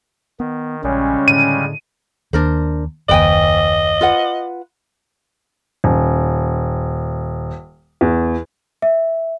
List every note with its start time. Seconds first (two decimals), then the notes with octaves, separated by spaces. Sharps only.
0.40 D#3 B3
0.84 A#1 C#3 G3 G#3 C#4
1.28 A2 D3 D#7
2.33 D#2 D4 A#4 C5
3.09 F#1 D#2 B4 D#5 G5 G#5
4.01 F4 B4 F#5
5.84 D#1
8.01 E2
8.82 E5